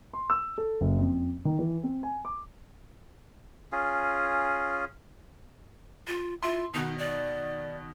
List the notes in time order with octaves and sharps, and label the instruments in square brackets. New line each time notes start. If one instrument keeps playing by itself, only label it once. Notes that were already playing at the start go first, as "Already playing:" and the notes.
[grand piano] C6
E6
A4
F#1
F2
D#3
E3
C4
G#5
D6
[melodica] C#4 F4 G#4
[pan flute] F4
[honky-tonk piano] E4 C6 [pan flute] F4
[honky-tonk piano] B2 D#3 F#4 [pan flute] D#4
[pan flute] D5